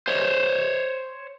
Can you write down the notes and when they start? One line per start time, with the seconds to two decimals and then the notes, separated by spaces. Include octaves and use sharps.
0.08 C5 C#5